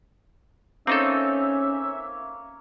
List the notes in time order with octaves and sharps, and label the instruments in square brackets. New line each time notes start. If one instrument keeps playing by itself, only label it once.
[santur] A#3 C#5 [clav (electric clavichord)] C4 D#4 A4 [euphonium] C#4 [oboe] E5